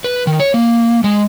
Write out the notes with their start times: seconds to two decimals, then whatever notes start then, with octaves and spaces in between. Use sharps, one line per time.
0.04 B4
0.27 D#3
0.40 C#5
0.54 A#3
1.04 G#3